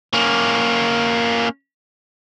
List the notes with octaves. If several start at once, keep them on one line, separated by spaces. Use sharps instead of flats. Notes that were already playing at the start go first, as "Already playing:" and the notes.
A#3 C#4